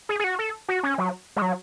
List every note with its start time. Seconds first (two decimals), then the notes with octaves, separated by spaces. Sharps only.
0.09 G#4
0.19 G#4
0.24 F#4
0.39 A4
0.68 F#4
0.83 C#4
0.98 F#3
1.36 G#3
1.42 F#3